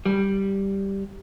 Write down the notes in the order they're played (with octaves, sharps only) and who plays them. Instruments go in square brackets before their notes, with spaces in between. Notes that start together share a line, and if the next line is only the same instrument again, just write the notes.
[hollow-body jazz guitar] G3